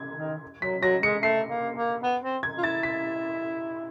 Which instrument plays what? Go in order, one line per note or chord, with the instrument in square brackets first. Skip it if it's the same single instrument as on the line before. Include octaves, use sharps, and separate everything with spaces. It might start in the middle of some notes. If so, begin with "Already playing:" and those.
Already playing: [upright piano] G#6
[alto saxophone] D#3
[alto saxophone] F#3 [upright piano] B6
[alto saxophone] F#3 [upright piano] A#6
[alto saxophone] G#3 [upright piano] C#7
[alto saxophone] A3 [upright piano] C7
[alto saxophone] A#3
A#3
B3
C4
[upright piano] G#6
[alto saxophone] F4
[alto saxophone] E4 [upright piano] A6
[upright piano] B6